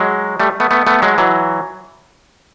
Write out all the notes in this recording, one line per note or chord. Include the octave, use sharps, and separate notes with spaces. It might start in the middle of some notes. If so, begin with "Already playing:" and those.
Already playing: F#3 G#3
G3 A3
A3 B3
A3 B3
A3 B3
F#3 G#3
E3 F#3